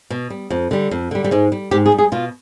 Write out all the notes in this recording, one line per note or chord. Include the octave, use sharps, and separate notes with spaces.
B2
G3
F2
D3 G3
F2
D3 G3
G3
G#2 G#3
G3
G#2 G4
G#4
G3
G#4
B2 F4